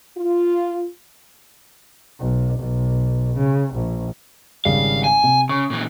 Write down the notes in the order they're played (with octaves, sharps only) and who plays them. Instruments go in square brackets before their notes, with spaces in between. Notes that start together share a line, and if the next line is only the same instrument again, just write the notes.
[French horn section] F4
[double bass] B1
B1
C#3
A#1
[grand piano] G#1 C#3 G3 [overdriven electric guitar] F5
[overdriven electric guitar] G#5
[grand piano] C3
[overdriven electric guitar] C#3 [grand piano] C#6
[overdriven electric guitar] A#2 E3